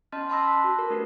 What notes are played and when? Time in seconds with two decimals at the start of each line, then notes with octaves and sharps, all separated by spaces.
0.12 C#4 D#5 A5 C6 F6 A6
0.30 A5 B5 C6 D6 E6 A#6
0.48 F#6 B6
0.64 F#4
0.79 A#4
0.90 A3 D4 G4 A#4 B4